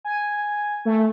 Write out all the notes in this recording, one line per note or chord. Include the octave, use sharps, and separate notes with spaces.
G#5
A3